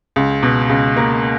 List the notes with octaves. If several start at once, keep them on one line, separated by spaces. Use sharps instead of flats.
C#2
B2
C#2
A#3